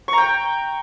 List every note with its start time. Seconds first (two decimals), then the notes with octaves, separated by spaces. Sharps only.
0.08 C#6
0.13 A#5
0.18 G5